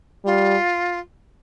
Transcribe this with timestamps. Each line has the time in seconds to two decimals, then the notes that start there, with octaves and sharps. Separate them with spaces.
0.25 G3 F4